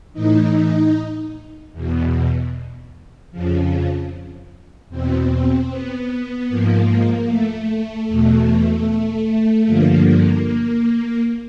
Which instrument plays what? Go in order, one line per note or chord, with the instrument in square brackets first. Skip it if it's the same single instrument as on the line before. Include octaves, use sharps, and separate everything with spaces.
[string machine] A2 E3 D#4
E2 B2
F2 C#3 F3
E2 B2 C4
B3
G#2 F3 A#3
A3
E2 B2
G2 D3 F3 A#3